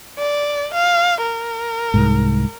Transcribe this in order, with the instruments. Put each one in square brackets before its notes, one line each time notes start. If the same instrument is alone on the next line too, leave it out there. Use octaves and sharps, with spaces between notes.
[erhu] D5
F5
A#4
[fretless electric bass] C2 G#2